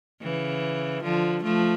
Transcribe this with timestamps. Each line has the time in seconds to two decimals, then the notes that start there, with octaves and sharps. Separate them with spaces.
0.23 C#3 E3
1.03 D3 F3
1.43 F3 A3